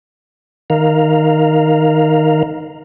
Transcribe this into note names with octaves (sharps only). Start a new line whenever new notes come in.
D#3 A#4 F5